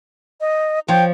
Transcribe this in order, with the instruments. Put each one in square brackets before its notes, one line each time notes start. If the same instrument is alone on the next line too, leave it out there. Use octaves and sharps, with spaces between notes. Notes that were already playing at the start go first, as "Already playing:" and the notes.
[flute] D#5
[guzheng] F3 C#5 [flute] G5